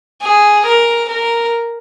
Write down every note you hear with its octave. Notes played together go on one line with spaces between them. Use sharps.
G#4
A#4
A#4